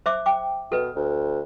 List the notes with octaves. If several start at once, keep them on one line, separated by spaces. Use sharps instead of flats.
C5 E5 D6
G5 D6
B2 A4 B4
D2